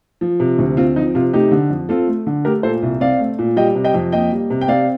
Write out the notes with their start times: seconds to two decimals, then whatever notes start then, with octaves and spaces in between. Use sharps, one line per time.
0.21 F3
0.40 C3
0.59 D2
0.77 C4 F4
0.96 F3 D#4
1.15 C3 F4
1.33 A3 D#4 G4
1.51 D3
1.70 F2
1.89 C4 F4 A4
2.07 A3
2.27 D3
2.45 A3 G4 A#4
2.63 A#2 A4 C5
2.82 C2
3.00 C4 D5 F5
3.19 A3
3.39 A#2
3.56 G3 D#5 G5
3.75 C3
3.84 D#5 G5
3.94 F2
4.12 A#3 D#5 G5
4.32 G3
4.50 C3
4.61 G5
4.68 C4 D5 F5